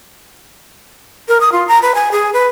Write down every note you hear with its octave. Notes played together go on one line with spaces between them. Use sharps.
A#4
D#6
F4
A#5
B4
G#5
G#4
B4